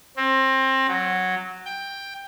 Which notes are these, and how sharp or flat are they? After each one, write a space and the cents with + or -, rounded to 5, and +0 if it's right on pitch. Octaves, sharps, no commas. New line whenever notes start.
C4 +25
F#3 -5
G5 +10